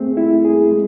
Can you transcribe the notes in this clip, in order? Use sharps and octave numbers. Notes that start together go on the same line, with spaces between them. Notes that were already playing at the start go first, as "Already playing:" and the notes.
Already playing: A3 C4 G#4
E4
G#4
G#3